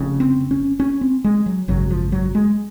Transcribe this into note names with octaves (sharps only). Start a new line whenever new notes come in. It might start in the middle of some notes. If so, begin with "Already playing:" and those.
Already playing: F1 F2 C#3
C4
C#4
C#4
C4
G#3
F#3
G#1 F#2 C#3 F#3
F3
F#3
G#3